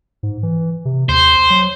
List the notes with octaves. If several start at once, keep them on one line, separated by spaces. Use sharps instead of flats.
G#2
E3
C3
D#2 C5
F#3